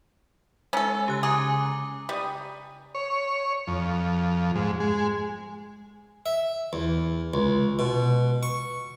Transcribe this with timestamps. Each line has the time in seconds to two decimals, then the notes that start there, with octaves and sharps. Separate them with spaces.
0.73 G#3 C#4 A4
1.08 C#3 G4 F#6
1.23 G#4 G#5 A#5 D6
2.09 G3 D#6
2.95 C#5
3.67 F2
4.56 G#2
4.80 G#3
6.26 E5
6.73 E2
7.34 C#2
7.79 B2
8.43 C#6